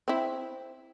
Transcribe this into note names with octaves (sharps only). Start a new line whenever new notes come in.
C4 E4